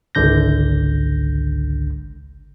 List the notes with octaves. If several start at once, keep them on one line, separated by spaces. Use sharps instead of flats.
G#1 C#2 D3 G6 A#6